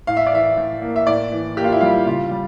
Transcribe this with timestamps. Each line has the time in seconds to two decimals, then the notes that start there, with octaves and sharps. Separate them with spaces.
0.07 A2 F5
0.17 E5
0.26 D5
0.32 E3 E5
0.57 A2
0.82 A#3
0.96 E5
1.07 A2 D5
1.32 E3
1.57 A#3 G4
1.64 F4
1.72 E4
1.81 G3 F4
2.06 C#3 F4
2.31 G3